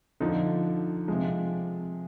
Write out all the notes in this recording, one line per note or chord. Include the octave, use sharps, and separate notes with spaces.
D3 F3 D#4
C3 F3 G#3